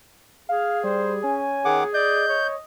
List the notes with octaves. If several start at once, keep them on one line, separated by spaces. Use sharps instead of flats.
G#4 F5
G3 C5
C#4 G#5
D#3 G#4 F#5 D6
D5 D#5 G6
C#5